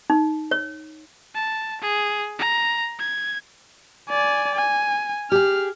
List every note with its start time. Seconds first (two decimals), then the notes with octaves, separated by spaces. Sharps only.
0.10 D#4
0.51 C#5
1.35 A5
1.81 G#4
2.39 A#5
2.99 G#6
4.09 D5 G#5
4.55 G#5
5.32 G4 G#4 F6